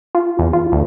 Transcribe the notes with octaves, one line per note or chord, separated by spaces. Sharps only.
F4
E2
F4
D2